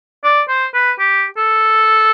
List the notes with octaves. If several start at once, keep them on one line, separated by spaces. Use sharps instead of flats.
D5
C5
B4
G4
A4